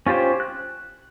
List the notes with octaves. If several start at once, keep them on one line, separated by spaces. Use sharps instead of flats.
C#4 F4 G4 C5
F#6